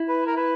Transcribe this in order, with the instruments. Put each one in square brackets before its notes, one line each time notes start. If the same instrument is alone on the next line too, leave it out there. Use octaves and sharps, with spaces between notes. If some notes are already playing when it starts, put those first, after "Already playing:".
Already playing: [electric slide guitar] E4
[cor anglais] B4
A#4
B4